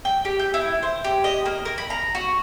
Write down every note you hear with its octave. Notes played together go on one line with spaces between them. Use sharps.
G5
G4
G6
E4
C5
G4
D#5
A#3
A#4
B5
A#5
F#4